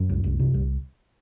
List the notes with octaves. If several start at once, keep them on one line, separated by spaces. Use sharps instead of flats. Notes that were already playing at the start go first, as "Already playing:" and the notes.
Already playing: F#2 F#3
C2
C2
C3
C2